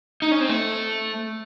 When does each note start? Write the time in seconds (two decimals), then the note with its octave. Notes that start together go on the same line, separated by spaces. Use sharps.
0.22 D#4
0.31 C#4
0.40 C4
0.49 A3